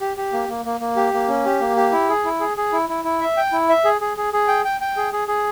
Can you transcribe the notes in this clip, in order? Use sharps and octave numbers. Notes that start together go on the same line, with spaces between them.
G4
G4
A#3
A#3
A#3
A#3
G4
A#3
C#4
G4
A#3
G4
E4
G#4
E4
G#4
G#4
E4
E4
E4
E5
G5
E4
E5
G#4
G#4
G#4
G#4
G5
G5
G5
G#4
G#4
G#4